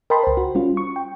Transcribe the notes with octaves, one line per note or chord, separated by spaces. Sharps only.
A#4 D#5 G5 A5 B5 C6
C#2 C5
F#4
G3 C#4 F4
C#6
G5